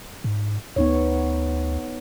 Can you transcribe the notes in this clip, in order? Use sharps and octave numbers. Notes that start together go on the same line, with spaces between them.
G#2
D2 B3 D#4 C#5